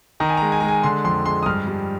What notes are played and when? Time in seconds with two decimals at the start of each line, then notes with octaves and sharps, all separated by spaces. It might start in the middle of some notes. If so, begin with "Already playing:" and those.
0.20 D#3 A#5
0.29 G#5
0.37 G#3 A#5
0.52 G#5
0.60 G#3 A#5
0.68 G#5
0.83 D3 C6
1.04 F2 C6
1.26 G#3 C6
1.43 D#6
1.46 G2 F6
1.67 G3